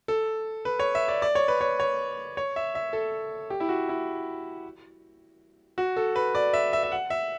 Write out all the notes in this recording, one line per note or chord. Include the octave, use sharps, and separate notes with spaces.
A4
B4
C#5
E5
D5
D5
C#5
B4
C#5
C#5
C#5
E5
E5
A4
G4
E4
F#4
E4
F#4
A4
B4
D5
E5
E5
E5
F#5
E5